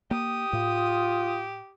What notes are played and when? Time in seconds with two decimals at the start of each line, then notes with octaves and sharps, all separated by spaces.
0.11 A#3 G4 D#6
0.53 A2 F4